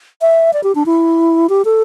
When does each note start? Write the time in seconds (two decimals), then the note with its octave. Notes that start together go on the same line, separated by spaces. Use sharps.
0.21 E5
0.53 D5
0.63 G4
0.75 D4
0.86 E4
1.49 G4
1.65 A4